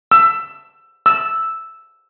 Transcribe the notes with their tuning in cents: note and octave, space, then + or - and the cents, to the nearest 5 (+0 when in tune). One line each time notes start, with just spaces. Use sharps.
E6 +15
E6 +0